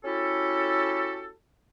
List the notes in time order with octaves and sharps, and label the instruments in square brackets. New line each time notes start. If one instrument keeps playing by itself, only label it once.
[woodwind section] C#4 E4 F#4 G4 A4